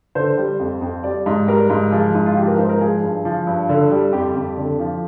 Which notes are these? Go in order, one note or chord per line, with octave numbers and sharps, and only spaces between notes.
D3 C5
G3
F2
F2
G3 D5
G#2
G3 A#4
G#2
F3 G#4
G#2
F4
F3 G4
A#4
G#2 C5
A#4
F3 G#4
G2
F3
G2
D3
G3
F2 G4
F2
D3
F3